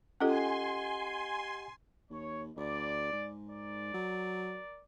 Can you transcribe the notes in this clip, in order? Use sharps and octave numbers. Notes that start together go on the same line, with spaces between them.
C#4 F4 G4 A4 D#5 F#5 G#5 C6
D#2 C#5
D2 D5
G#2
A#4 D5
F#3